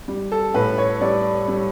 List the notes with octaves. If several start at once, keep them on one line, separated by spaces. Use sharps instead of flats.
G3
A4
A2 B4
C#5
G3 D5
G3